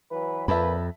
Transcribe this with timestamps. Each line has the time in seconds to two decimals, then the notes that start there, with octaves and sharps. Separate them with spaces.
0.11 E3 F#3 B4
0.48 F2 A#2 B4 E5 A5 B5